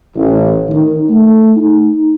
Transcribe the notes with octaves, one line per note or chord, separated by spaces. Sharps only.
A1
D#3
A3
D#4